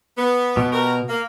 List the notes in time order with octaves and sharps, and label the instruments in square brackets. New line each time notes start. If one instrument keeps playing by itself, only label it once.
[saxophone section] B3
[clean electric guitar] B2
[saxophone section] G3 F#4 A#4
A#3